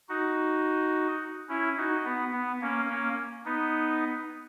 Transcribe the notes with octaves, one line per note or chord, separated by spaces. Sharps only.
D#4 F#4
C#4 E4
D#4 F#4
B3
B3
A#3 C#4
A#3 C#4
B3 D#4